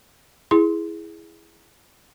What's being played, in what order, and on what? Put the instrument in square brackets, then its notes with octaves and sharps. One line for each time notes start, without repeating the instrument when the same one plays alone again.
[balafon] E4 G#4 C6